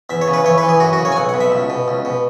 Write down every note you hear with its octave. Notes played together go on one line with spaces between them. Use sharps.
E2 E5
C#5
C#3
B4
E3 C#5
B4
E3
G#4
F#2 F#4
F#4
C#3
C#5
G#5
B1 F#5
F#5
B2
E5
C#2
B2
C#2
B2